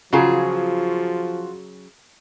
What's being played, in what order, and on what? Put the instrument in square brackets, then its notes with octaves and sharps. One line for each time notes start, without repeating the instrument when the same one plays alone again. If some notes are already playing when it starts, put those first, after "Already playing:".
[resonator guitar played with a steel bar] C#3 F#3 G#4 [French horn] F3 [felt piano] F4 F#4